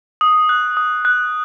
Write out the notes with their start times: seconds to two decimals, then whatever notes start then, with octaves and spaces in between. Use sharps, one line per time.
0.21 D#6
0.49 F#6
0.77 D#6
1.05 F#6